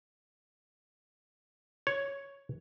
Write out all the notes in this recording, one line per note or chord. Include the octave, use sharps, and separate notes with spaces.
C#5